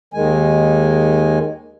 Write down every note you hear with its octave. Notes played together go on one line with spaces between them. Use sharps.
D#2 D#3 G#3 G#5